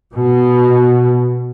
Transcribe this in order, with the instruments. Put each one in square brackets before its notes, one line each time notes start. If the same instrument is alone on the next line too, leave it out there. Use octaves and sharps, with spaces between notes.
[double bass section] B2